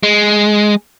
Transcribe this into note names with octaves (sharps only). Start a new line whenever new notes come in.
G#3